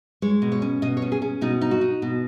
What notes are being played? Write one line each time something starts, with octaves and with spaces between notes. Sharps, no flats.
G#3 C#5
B2
C#5
C#4
B2 D#5
C#5
C#4
G#4
C#4
B2 D#4
D#4
F#4
D#4
B2